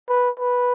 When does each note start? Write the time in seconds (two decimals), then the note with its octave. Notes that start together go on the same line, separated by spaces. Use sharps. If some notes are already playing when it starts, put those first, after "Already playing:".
0.09 B4
0.39 B4